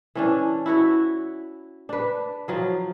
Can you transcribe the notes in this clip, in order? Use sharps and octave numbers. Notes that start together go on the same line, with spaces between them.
E3 C#4 D4
E4 F#4 C#5 E5
D4 B4
F3 F#3 F4